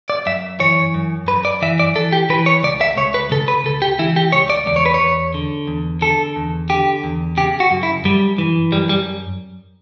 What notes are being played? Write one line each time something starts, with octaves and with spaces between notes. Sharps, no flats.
D5
F#2 E5
E3 C#5
F#2
F#2 B4
D5
E3 E5
D5
E3 A4
G4
E3 B4
C#5
C#2 D5
E5
C#2 C#5
B4
C#3 A4
B4
C#2 A4
G4
E3 E4
G4
C#2 C#5
D5
E2 D5
C#5
B4
C#5
E2
D3
E2
D3 A4
E2
D3 G4
E2
C#3 G4
F#4
F#2
E4
F#2 G3
E3
F#2 G3
G3